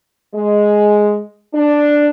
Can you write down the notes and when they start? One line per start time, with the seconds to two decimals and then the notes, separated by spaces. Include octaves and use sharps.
0.34 G#3
1.54 D4